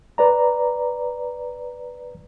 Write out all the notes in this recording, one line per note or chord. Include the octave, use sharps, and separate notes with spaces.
B4 D5 A#5